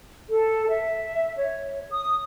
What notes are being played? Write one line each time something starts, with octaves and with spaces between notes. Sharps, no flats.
A4
E5
C#5
D#6